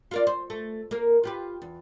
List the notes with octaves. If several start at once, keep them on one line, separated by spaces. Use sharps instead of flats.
F4 A#4 D5
C5
A3
A#3 A#4
F4 G4 B4
E2